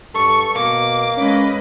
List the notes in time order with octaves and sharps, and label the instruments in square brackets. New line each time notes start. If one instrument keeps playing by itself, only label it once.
[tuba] G2 [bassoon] A4 [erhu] C#6
[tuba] B2 [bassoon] A#3 [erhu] D6
[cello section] G#3 B4 D#5 [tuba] C#4